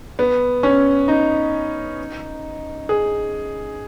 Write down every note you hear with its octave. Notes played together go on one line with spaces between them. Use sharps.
B3
C#4
D#4
G#4